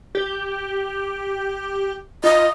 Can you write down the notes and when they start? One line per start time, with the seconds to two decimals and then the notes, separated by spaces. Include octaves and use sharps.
0.15 G4
2.24 F4 D#5